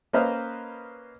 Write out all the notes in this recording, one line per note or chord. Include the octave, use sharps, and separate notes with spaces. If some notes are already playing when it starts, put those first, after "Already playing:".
A#3 C#4 B4 C5 D#5 F5